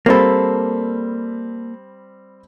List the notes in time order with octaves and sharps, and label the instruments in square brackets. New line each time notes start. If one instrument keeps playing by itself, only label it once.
[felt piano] G3 C4 B5 [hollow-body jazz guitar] A#3 A4